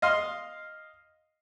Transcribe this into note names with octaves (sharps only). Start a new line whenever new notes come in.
D#5 F5 C6